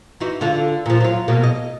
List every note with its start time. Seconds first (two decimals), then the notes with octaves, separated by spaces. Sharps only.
0.20 E3 D#4 F#4
0.41 D3 F4 A4
0.86 A#2 F3
1.00 F#3 F4
1.28 B2 F#3 A#3
1.43 D#5